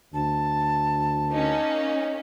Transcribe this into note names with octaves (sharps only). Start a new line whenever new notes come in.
D2 A5
A#3 C#4 D#4